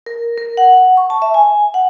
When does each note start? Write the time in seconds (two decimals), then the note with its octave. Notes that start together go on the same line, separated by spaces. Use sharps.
0.06 A#4
0.38 A#4
0.57 F#5
0.97 C#6
1.10 A5
1.22 E5
1.34 G#5
1.74 F#5